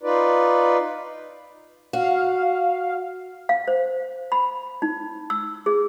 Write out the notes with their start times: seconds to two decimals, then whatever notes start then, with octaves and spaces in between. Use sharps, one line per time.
0.03 D#4 F4 B4 D5
1.93 F#4 F5
3.49 F5
3.68 C5
4.32 B5
4.82 D#4
5.30 E6
5.66 G#4